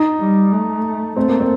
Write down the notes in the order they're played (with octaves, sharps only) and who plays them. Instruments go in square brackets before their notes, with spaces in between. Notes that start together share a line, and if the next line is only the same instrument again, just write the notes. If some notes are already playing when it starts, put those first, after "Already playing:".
Already playing: [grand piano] D#4
[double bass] G3
A3
[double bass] A3 [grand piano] C4
[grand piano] A#3
C4